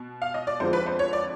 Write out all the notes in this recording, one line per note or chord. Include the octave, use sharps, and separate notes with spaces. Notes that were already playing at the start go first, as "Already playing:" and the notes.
Already playing: B2
F5
D#5
D5
F2 D3 F3 G#3 C5
B4
C5
C#5
D5